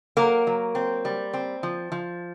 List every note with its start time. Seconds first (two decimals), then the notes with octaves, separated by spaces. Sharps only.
0.17 F#3 A#3 A#4
0.47 F#3
0.75 C4
1.05 G3
1.33 C4
1.63 F3
1.92 F3